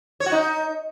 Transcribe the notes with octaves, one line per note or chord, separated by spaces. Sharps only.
C#5
F#4
D#4